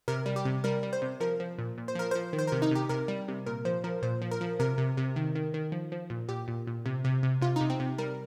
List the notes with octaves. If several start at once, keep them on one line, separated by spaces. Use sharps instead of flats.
C3 A#4
G3
G4
C3
G3 A#4
G3
C5
C3
F3 A#4
F3
A#2
A#2
C5
F3 A#4
F3 C5
D#3
C5
C3 A#4
D#4
C3 G4
C3 A#4
G3
C3
A#2 A#4
F3 C5
F3 A#4
A#2 C5
F3
A#4
F3
C3 A#4
C3
C3
D#3
D#3
D#3
F3
F3
A#2
A#2 G4
A#2
A#2
C3
C3
C3
C3 F4
C3 D#4
C4
C3
G3 A#4